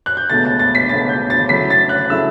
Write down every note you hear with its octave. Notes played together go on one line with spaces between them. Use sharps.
F#6
G6
C#2 B2 A3 A6
A6
A6
B6
C#2 B2 A3 A6
G6
A6
C#3 F#3 A3 E4 B6
A6
F#6
C#3 F#3 A3 E4 E6